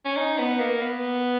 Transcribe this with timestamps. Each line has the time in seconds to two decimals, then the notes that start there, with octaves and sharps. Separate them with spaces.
0.05 C#4
0.17 D#4
0.38 B3
0.60 A#3
0.82 B3